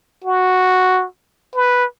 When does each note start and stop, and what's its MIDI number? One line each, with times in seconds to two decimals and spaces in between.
0.24 1.05 66
1.55 1.85 71